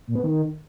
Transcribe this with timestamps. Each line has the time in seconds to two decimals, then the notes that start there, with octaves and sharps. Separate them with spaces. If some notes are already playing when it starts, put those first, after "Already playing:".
0.07 A#2
0.15 B3
0.24 D#3